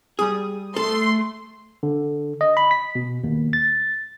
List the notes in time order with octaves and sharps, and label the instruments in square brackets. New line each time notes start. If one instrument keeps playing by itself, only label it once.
[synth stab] G3 D#6 [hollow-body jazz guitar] G#4
[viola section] A3 [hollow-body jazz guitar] A4 [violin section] C6
[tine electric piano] D3
D#5
B5
B6
B2
D#2
A6